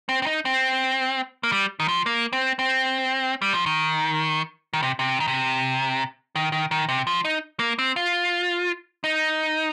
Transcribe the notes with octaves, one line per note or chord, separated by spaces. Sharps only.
C4
C4
D#4
C4
A#3
G3
D#3
F3
A#3
C4
C4
G3
F3
D#3
D#3
C3
C3
D#3
C3
D#3
D#3
D#3
C3
F3
D#4
A#3
C4
F4
D#4